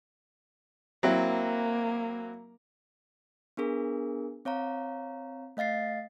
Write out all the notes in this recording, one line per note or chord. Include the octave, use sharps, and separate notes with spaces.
F#3 A#3 C4 E4
B3 D4 G#4 A#4
C4 C#5 F5 A#5
A3 D#5 F5 A6 C7